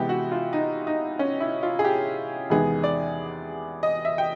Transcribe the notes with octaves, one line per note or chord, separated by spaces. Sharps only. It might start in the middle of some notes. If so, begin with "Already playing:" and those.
Already playing: C3 E3 G#3 B3 G4
F#4
F4
D#4
D#4
C#4
E4
F4
G#4
G4
E2 C3 D#3 G#3 B3 G#4
D5
D#5
E5
G5